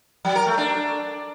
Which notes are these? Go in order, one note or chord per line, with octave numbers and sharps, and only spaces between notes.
F#3
A#4
A3
D4